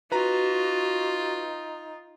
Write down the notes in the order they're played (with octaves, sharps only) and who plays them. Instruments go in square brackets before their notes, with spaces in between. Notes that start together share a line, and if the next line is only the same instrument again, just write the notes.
[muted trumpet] D#4 [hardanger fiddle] F4 [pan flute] F#4 [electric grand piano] B4 A#5